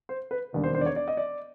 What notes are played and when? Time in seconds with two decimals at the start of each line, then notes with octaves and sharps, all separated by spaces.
0.09 C5
0.31 B4
0.53 E1 D#2 D3 G3
0.64 C5
0.75 C5
0.81 D5
0.86 C#5
0.96 D5
1.08 D#5
1.17 D5